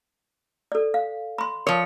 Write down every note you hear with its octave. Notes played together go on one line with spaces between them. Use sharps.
A4 D5
F5
B5 C6
F3 A#4 C#5